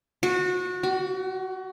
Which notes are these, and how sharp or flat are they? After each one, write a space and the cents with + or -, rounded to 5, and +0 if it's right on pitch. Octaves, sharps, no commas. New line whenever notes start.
F#4 -25
F#4 +30